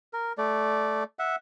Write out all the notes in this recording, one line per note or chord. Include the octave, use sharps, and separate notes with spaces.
A#4
A3 D5
E5 F#5